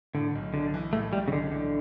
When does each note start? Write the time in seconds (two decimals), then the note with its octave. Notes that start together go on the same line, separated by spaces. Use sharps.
0.14 A2 D3
0.35 B1
0.54 B1 D3
0.74 E3
0.93 A2 A3
1.13 B1 G3
1.28 C#3
1.32 B1 D3
1.51 D3 E3